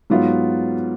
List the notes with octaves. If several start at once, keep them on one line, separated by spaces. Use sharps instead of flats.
G#2 F#3 B3 F4